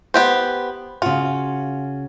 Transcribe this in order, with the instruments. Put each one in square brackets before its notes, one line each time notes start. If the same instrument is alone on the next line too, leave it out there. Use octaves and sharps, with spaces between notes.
[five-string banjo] B3 G4 C5
[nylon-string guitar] C#3 F#4 [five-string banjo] F4